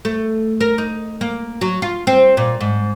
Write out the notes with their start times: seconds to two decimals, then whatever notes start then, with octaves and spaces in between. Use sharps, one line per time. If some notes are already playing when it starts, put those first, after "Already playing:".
0.05 A3
0.61 A#4
0.78 D#4
1.21 A#3
1.61 F#3
1.82 F4
2.07 C4
2.37 A#2
2.61 G#2